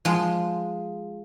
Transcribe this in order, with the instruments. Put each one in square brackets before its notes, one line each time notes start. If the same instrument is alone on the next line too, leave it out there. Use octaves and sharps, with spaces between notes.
[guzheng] F3 G#3